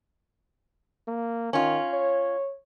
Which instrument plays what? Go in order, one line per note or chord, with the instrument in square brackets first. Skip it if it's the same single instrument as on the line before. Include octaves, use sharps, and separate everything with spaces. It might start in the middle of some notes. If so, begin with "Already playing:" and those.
[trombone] A#3
[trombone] D#3 [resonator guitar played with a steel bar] C#4 F4
[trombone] C#5